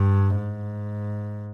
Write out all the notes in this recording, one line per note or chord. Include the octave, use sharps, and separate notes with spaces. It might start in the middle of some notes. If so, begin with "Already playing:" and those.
Already playing: G2
G#2